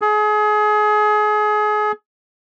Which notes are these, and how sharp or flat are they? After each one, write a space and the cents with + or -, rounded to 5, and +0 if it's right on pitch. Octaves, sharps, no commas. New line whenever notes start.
G#4 +30